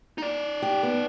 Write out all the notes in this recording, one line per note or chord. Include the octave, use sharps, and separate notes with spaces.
D#4 D5
G4
B3